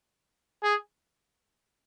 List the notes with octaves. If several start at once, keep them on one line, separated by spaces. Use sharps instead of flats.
G#4